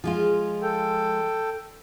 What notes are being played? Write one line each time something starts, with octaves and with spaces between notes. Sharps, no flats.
F3 G#3 F4
A4 G5